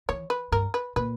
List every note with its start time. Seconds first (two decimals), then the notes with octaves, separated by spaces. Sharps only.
0.09 E3 C#5
0.30 B4
0.52 G2 A#4
0.74 B4
0.96 A#2 B4